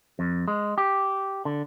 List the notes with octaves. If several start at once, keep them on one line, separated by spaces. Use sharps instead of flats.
F2
G#3
G4
D3